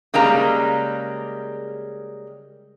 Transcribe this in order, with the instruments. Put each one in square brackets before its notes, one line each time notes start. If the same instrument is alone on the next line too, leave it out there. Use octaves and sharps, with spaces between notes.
[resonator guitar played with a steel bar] C#3 G3 G#3 A#3 A#5